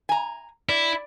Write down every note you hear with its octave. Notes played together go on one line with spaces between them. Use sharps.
G#5 A#5
E4 D5